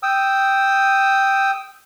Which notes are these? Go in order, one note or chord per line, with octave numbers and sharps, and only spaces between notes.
G5 D#6 E6